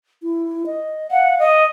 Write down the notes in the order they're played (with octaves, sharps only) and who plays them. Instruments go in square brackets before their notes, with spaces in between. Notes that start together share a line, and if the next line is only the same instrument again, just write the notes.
[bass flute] E4
D#5
[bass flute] F5 [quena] F#5
[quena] D#5